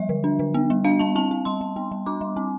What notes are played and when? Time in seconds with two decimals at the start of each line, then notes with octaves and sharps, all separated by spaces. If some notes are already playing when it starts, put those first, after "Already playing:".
Already playing: F3 G3 E5
0.09 D3
0.24 D4
0.39 D3
0.54 B3
0.70 G3
0.85 D4 F5
0.99 G3 A5
1.15 C4 A5
1.31 C4
1.45 G3 C6
1.61 G3
1.76 B3
1.91 G3
2.06 D4 D6
2.21 G3
2.36 C4